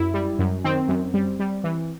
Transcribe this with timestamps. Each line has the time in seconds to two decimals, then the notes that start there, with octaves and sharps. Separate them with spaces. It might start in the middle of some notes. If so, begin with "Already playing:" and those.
Already playing: F#2 E4
0.14 G3
0.39 F#2
0.64 D#3 C4
0.88 F#2
1.14 G3
1.40 G3
1.64 E3